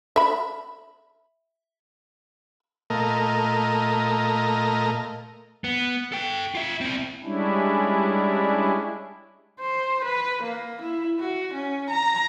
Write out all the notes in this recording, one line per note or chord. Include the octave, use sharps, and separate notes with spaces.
E5 B5
A#2 A3 A#4 D#5
B3
A4 G5
F4 E5
C4 E4
G3 G#3 C#4 D4 E4
C5
B4
A#3
E4
F#4
C#4
A#5